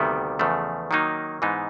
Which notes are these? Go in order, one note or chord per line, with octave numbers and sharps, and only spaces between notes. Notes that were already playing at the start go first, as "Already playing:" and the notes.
Already playing: D2 C3 D#3 G3 B3
E2 C#3 F3 A3
D#3 F#3 A#3 D#4
G#2 E3 G#3 B3 D#4